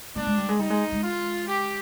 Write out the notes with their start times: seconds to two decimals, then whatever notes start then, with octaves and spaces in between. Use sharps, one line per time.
0.16 A#3 D4
0.26 G#3
0.38 G3
0.49 G#3
0.59 G3 D#4
0.70 G#3
0.92 G#3
1.03 F4
1.47 G4